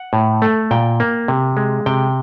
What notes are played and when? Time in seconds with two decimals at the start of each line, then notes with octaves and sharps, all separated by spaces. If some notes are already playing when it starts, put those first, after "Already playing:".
Already playing: F#5
0.13 A2
0.42 A3
0.71 A#2 G5
1.00 A#3
1.28 C3
1.57 G#3
1.86 C3 G5